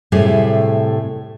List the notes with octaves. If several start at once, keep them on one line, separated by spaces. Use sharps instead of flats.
A2 C3 G3 A3 G#4